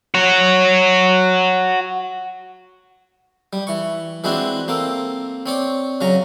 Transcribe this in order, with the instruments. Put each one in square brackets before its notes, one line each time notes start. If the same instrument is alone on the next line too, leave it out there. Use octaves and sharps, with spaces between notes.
[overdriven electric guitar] F#4 C#5
[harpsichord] G3
E3 C#6
E3 G#3 C4 D4 E4 F#4
A#3 C4 A4
C4 C#5 D5
C#3 F#3 C#4 A#5